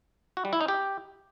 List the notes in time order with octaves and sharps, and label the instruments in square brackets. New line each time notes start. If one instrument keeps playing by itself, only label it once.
[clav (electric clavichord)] F#4
G3
E4
D#4
G4